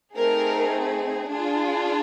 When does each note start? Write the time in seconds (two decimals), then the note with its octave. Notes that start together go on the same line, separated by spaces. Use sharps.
0.15 A3 C4 D#4 G#4 A#4
1.28 D4 F4 G#4